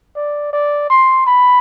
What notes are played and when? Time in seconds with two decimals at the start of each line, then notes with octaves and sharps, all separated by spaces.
0.16 D5
0.53 D5
0.90 C6
1.27 B5